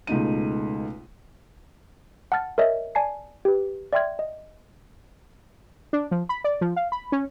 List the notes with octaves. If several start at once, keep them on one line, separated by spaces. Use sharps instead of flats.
C#2 B2 A3 D#4 D#7
F#5 A5 F6 A6
A#4 C#5 D#5 E5
D5 G#5 A5 C7
G4 B4
D5 E5 G5 C6 F6 G#6
D#5
D4
F3
B5
D5
F3
F5
B5
C#4